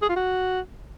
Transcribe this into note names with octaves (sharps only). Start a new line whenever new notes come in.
G#4
F4
F#4